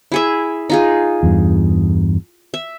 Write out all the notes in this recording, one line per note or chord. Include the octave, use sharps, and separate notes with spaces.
E4 G#4 E5
D#4 F4 G#4
E2 G2
E5